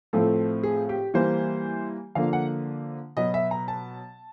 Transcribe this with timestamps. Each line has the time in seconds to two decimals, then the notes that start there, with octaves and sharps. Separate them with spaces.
0.13 A2 F3 A3 C4 A4
0.63 G#4
0.89 G4
1.14 E3 G3 A#3 C5
2.15 D3 F3 A#3 F5
2.33 F#5
3.17 B2 F#3 B3 D#5
3.34 E5
3.51 A#5
3.68 A5